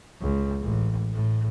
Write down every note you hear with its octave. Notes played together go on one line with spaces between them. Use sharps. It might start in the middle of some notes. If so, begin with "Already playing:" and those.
C#2
A1
A2